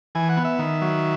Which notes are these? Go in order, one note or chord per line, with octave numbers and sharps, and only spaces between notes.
E3 G#5
F#5
B3
E5
D#3
F#3